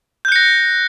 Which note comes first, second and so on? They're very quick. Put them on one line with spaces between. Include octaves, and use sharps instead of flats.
G6 F#6 C#7 A#6